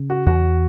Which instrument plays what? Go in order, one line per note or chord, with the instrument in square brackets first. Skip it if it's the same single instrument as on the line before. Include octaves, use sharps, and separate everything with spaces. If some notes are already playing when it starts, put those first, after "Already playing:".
Already playing: [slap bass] C#3
[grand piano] F#4
[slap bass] E2 [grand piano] F#4